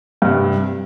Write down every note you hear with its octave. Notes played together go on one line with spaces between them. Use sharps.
G2 C3